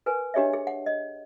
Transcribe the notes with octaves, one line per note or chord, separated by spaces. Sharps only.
A#4 B4 G#5
D4 G4 G#4 C#5 D#5 E5
G#4
F#5
D#5